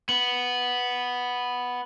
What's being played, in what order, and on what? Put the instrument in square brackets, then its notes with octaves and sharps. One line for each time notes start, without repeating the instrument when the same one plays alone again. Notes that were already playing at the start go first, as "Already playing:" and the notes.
[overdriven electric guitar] B3 [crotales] F#7